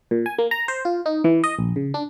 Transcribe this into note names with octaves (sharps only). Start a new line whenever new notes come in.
A#2
G#5
A#3
A#5
C5
F4
D#4
E3
D#5
A#1
C#3
D4